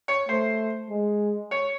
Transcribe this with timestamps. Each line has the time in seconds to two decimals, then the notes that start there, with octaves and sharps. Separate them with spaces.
0.08 C#5
0.29 A3 C5
0.90 G#3
1.51 C#5